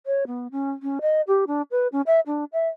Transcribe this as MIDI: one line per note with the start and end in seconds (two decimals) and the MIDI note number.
0.06 0.27 73
0.27 0.48 59
0.52 0.72 61
0.83 0.99 61
1.01 1.21 75
1.27 1.45 67
1.47 1.62 62
1.71 1.88 71
1.92 2.01 61
2.07 2.20 76
2.27 2.45 62
2.53 2.68 76